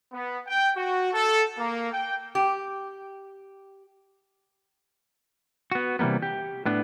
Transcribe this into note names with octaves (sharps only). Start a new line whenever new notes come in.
B3
G5
F#4
A4
A#3
G5
G4
B3 F#4
C3 E3 G3 A#3 B3
G4
A2 B3 D4